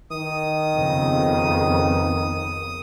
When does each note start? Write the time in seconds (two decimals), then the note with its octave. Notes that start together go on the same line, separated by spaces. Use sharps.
0.11 D#3 D#6
0.74 F2 C#3 B3